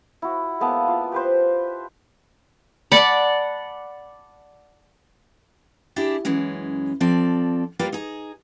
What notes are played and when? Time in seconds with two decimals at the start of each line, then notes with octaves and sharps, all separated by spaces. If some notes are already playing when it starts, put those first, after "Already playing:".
0.22 E4 F#4
0.60 G#3 A#3 B3 A5
0.88 F4
1.12 G4 B4 C5
2.92 D5 F#5 A5 B5
5.96 D4 E4 G4 G#4
6.25 F#2 E3 G#3 C#4
7.00 F3 C4 A4 D5
7.79 G3 A#3 F4 B4 D5
7.92 D#4 G#4